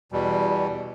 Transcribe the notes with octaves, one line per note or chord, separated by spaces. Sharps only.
E2 B2 G3